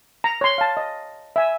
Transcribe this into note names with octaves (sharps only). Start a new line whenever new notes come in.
A#5
C#5 C6
F5 A5
D#5
E5 G#5